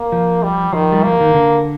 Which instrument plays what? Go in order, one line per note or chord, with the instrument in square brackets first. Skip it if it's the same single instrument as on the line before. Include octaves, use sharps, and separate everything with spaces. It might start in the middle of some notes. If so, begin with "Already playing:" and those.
Already playing: [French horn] A#3
[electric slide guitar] F3
[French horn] G3
[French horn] D#3 [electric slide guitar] F3
[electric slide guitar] G3
[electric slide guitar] F3 [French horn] A#3
[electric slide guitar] D#3
D3